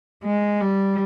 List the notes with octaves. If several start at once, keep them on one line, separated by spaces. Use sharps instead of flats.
G#3
G3